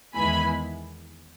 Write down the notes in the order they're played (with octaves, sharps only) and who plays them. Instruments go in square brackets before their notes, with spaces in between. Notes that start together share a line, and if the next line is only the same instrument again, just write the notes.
[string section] E2 D#3 G#3 B3 E4 G#5 B5